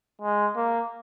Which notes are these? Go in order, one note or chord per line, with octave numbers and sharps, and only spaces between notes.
G#3
A#3